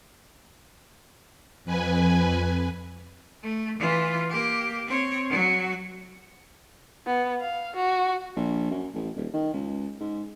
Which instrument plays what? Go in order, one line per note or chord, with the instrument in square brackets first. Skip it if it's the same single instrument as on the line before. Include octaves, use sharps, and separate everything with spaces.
[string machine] F2 B4 G#5
[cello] A3
E3 F4
A#3 G4
C4 C#5
F#3 F#4
[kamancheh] B3
F5
F#4
[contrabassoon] A#1
F#2
A1
D#1
D#3
C#2
G#2